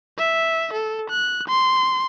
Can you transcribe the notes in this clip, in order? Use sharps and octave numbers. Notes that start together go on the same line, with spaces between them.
E5
A4
F#6
C6